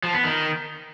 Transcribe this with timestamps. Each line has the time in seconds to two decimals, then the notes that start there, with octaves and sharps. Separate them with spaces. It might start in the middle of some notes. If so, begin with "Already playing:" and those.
0.04 F3
0.14 B3
0.24 D#3